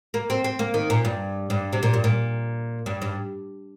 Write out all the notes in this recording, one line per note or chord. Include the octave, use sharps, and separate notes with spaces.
A#3
C4
C4
A#3
D#3
A#2
G2
G2
C3
A#2
G2
A#2
G2
G2